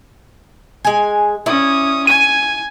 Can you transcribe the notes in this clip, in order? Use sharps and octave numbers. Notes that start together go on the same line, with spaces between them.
G#3 G#5
C#4 E4 D5 D#6
G#5 D#7